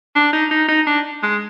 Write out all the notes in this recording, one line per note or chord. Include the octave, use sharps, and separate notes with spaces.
D4
D#4
D#4
D#4
D4
G#3